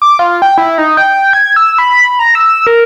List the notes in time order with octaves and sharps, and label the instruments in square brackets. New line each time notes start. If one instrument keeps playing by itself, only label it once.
[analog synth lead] D6
F4
G5
E4
D#4
G5
G#6
E6
B5
A#5
E6
A#4